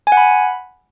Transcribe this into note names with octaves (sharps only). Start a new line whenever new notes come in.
G#5
F#5
B5